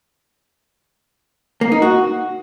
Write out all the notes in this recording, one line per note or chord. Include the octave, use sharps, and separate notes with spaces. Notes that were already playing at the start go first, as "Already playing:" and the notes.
A#3
D#4
F#4